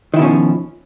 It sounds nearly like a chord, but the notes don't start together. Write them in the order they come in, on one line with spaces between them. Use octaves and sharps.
D#3 E4 B2 C#4 F3